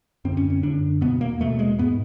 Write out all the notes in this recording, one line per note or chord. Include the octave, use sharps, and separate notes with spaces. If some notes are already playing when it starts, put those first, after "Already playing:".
F#2 D3 C4
C#4
C#4
F#2 D3 D4
E2 B2 B3
A#3
E2 B2 A3
G#3
G#2 B3